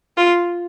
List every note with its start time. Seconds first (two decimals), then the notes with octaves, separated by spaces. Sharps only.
0.17 F4